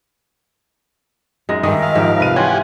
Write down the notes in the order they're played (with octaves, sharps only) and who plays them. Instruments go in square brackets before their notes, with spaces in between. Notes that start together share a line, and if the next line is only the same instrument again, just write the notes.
[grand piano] F#2 D#4 A#6 [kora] G#3
[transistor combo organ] G2 [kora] D#3 G#3 [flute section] A#4 D#5 E5 [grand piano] D#6
[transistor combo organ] F5
[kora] G#2 F3 G4
[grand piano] C2 F4 D#7 [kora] B4
[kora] E3 [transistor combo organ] G4 F#5 G#5 [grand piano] C#5 C6